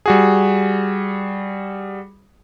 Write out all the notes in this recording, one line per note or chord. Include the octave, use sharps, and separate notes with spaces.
G3 F#4 G#4